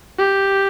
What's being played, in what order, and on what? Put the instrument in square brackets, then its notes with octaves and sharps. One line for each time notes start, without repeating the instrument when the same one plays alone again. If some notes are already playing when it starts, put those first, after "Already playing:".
[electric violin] G4